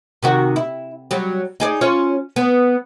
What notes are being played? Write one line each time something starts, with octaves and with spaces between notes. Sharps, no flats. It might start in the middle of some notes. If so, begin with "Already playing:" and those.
C3 D#3 F#4
E4
F#3 G3
D#4 G#4 D5
C#4 F4 C#5
B3